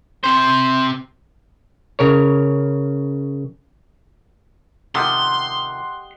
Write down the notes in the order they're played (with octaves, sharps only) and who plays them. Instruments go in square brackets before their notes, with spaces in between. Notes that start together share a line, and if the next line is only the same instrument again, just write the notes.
[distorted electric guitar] C3 C5
[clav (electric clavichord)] C#3 A#4 C#5
[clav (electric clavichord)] C3 D#3 F3 [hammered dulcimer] G4 D#5 F#5 [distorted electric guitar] C6